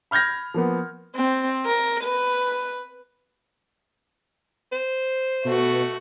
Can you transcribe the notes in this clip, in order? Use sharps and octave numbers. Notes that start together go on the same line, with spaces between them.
B5 F6 G6 G#6 A#6
F3 A#3 B3
C4
A#4
B4
C5
B2 A3 F#4